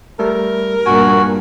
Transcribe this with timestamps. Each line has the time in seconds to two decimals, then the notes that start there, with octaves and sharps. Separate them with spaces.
0.19 G3 A3 A4 A#4
0.86 G2 A#2 F#4 G#5